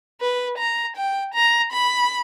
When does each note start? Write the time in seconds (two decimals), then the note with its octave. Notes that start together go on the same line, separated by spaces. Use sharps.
0.21 B4
0.59 A#5
0.97 G5
1.34 A#5
1.73 B5